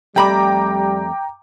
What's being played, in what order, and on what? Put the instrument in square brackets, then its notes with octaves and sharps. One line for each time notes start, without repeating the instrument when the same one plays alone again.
[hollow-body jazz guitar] F2 A3 B5 [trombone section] G3 [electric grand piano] G5 A#5 D6